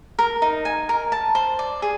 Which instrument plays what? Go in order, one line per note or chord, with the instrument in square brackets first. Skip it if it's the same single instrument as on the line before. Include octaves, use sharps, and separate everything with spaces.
[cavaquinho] A#4
D#4
G#5
A#4
A5
C5
D5
G#4